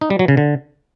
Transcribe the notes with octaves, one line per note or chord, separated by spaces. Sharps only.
D#4
G3
F#3
C#3
D3